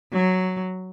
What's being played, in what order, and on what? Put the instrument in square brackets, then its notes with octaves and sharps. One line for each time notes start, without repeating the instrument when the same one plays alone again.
[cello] F#3